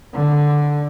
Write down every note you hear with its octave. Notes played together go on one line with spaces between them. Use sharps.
D3